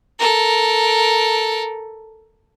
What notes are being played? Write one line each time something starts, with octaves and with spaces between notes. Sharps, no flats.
A4 A#4